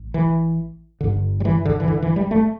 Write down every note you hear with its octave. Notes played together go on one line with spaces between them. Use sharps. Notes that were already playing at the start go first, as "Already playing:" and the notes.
Already playing: A1
E3
G1 G2 D3
G3
E3
D3
E3
D3
E3
G3
A3